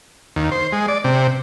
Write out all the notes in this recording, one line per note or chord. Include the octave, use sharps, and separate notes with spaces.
D#2
C5
G#3
D5
C3